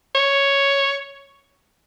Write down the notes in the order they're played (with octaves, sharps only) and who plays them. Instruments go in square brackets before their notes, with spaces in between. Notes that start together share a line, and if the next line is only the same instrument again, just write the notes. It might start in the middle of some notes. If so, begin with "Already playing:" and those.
[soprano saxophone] C#5